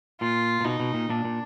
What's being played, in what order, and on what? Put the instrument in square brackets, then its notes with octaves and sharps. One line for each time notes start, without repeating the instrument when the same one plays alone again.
[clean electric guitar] A#2 [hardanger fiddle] F4
[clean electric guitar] A#2
[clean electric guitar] B2 [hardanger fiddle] D#4
[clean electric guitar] B2
A#2
[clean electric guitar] A#2 [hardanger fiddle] D4
[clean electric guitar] A#2